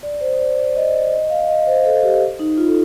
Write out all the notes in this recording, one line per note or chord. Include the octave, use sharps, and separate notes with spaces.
D5
C5
D5
D5
D#5
D#5
F5
D#5
C5
A4
G4
D#4
F4
A4